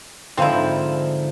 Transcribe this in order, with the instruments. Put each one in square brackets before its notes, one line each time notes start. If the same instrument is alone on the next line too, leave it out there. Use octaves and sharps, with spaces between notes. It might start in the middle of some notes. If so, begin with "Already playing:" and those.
[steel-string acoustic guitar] G#2 F3 [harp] D3 [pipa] C4 D#4 E4